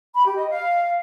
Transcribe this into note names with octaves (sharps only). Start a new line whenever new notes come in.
B5
G4
D#5
F5